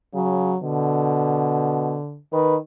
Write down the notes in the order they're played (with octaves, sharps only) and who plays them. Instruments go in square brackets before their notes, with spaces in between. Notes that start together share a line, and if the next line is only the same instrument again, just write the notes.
[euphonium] C#3 [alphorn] F#3
[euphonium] B2 [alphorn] D3
[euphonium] D#3 [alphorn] B4